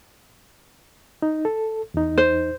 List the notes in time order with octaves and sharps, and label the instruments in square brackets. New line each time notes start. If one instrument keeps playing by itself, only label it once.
[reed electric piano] D#4
A4
E2 D#4
[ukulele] C5